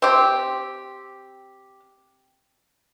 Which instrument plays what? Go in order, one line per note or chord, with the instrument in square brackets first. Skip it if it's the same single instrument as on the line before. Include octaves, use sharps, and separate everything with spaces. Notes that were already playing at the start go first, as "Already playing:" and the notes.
[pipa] C4 G4